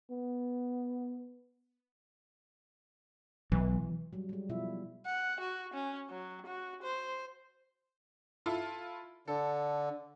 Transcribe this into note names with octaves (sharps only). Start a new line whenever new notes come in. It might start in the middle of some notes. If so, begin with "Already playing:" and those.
B3
B1 E3
F#3 G3
G3 G#3
B2 F3 E4 F4 E5
F#5
F#4
C#4
F#3
F#4
C5
E4 F4 A4
D3 A4